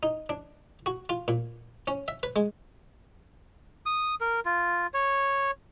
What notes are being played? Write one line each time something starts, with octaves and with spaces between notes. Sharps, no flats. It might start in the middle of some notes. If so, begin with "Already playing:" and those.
D#4
D4
F#4
F4
A#2
C#4
E5
B4
G#3
D#6
A#4
F4
C#5